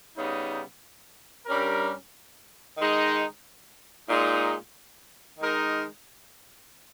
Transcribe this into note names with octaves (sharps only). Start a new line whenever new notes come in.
C#3 G3 B3 D#4
G2 G3 C#4 G4 A#4
D#3 G#3 D#4
A#2 G#3 D#4
D#3 G#3 D#4 A#4